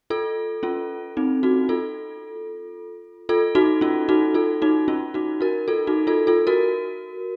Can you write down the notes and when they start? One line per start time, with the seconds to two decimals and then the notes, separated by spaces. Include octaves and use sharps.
0.10 F4 A4
0.63 C#4 F4
1.17 C4 D#4
1.43 D#4 F#4
1.69 F4 A4
3.29 F4 A4
3.55 D#4 F#4
3.81 C#4 F4
4.09 D#4 F#4
4.34 F4 A4
4.62 D#4 F#4
4.88 C#4 F4
5.14 D#4 F#4
5.41 F#4 A#4
5.68 F4 A4
5.87 D#4 F#4
6.07 F4 A4
6.27 F4 A4
6.47 F#4 A#4